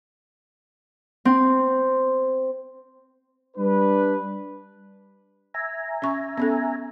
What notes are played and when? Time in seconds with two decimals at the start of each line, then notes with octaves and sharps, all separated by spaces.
1.25 C4
3.57 G3 D4 B4
5.54 E5 G#5 A#5
6.02 C#4 C#6
6.37 B3 C#4 A4